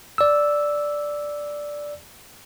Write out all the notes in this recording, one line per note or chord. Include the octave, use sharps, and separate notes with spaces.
D5 E6